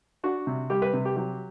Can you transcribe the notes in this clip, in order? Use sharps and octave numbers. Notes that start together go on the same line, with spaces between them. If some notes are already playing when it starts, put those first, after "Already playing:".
D4 F#4
C3
G3 G4
B4
C3
G4
F#3 G4